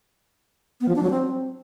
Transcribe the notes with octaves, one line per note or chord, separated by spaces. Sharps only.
B3
F3
D4
F#3
C4